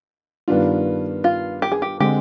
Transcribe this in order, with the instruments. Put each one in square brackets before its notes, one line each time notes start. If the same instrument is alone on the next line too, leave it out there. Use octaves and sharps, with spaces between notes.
[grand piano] G2 D#3 B3 D4 F4
[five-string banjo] F4
G4
G#4
G4
[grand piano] D3 G#3 C4 [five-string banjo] G4